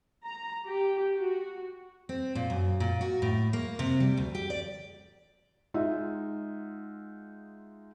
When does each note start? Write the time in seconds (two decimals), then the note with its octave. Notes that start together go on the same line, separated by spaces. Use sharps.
0.24 A#5
0.66 G4
1.18 F#4
2.09 C4
2.35 A#2
2.50 F#2
2.80 A#2
3.01 F#4
3.22 A2
3.53 A#3
3.79 C3
4.00 G3
4.17 D2
4.35 G4
4.50 D5
5.74 G#3 D#4 F4 E5 F#5